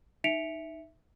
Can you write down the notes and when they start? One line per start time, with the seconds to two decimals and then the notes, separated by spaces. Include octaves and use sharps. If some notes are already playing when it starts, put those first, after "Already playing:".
0.24 D#4 E5 B6 C#7 D7 F7